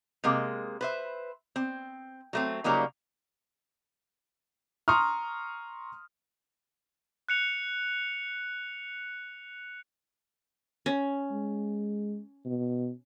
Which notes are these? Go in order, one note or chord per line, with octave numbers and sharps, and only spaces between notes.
C3 G#3 A#3
B4 C5 E5
C4
F#3 A3 C4
C#3 F#3 G3 A#3 D#4
A#5 C6 C#6 D#6 F6
F#6 C#7 F7
C#4
G#3
B2